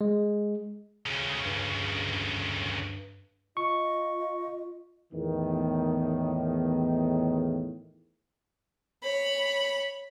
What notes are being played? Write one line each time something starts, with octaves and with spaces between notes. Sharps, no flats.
G#3
D2 C#3
G2
F4 D#5 C#6
E2 A2 D#3
C#5 B5